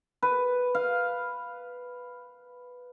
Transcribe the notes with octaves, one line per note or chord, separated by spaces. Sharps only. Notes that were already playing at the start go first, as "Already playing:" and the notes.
B4
F5